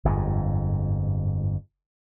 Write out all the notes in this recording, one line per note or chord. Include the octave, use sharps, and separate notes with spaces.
G1 F2 G#2